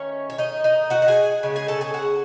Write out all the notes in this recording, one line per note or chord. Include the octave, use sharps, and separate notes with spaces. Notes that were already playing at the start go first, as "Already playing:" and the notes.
Already playing: D#3 A3 C#4 C#5
C#5
D#4 D#5
D#4 D#5
F#4 F#5
F#5
G#4 G#5
C#3 G#3
G#4 G#5
A4 A5
G#4 G#5
F#4 F#5